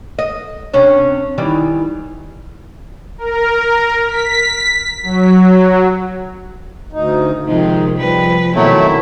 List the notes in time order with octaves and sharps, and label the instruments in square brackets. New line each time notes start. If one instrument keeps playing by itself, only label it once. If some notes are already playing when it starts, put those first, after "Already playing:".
[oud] D#5
C3 C#4 D4
D#3 E3 G3
[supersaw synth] A#4
B6
F#3
[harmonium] D2 D#4
[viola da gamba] C3 F3 G#3 [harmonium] D#3 D#4
[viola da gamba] F3 B4 [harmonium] G3
[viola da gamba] B2 C4 E4 [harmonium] D#3 [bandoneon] F#3 A3